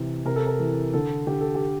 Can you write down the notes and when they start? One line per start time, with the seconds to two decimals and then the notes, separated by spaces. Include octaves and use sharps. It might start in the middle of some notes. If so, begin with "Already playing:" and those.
Already playing: C3 E3
0.25 C3 A#4
0.36 A4
0.47 A#4
0.59 E3
0.93 D3 A4
1.27 D3 G4
1.41 A4
1.55 G4